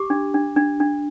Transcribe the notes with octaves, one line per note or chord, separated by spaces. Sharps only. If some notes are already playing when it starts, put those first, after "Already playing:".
Already playing: G4 D6
D4
D4
D4
D4